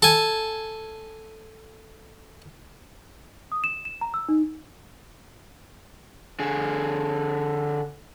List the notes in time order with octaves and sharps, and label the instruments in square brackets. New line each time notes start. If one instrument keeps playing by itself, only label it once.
[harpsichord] A4 G#5
[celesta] D#6
E7
E7
A#5
E6
D#4
[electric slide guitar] D3 G#4